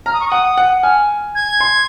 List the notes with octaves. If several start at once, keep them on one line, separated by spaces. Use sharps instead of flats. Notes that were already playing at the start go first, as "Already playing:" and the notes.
A#5 F6
D#6
C#6
F#5 D#6
F#5
G#5 F6
G#6
C6